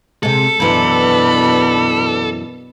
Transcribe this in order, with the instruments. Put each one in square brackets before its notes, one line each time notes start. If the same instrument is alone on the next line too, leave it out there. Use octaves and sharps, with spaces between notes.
[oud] C3 G#3 [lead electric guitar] A4
[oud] F#2 E3 C4 [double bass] B2 D4 [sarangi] B5